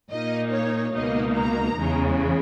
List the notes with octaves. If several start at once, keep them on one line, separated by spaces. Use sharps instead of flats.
A#2 A#3 D#4 D#5
C#5
C#2 B2 A#3 D#4 D#5
A#5
E2 C#3 G#3